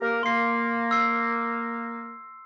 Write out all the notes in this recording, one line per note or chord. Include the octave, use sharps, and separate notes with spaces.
A#3 G4 A#4
A#3 C6 C7
E6 C7